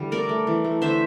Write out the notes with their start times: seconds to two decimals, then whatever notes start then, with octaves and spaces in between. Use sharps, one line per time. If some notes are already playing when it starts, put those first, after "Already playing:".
Already playing: D3 E3 G3
0.11 A3 A#4 D5
0.29 A3
0.47 E3
0.64 A3
0.81 D3 C5 E5